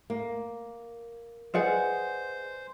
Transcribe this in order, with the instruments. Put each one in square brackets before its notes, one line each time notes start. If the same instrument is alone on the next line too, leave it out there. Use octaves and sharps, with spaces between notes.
[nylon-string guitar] A#3
[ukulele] G#4 D5 F#5 [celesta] B4 D#5 G#5 [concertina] C5